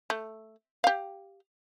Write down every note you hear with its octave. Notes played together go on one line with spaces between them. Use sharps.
A3
G4 F5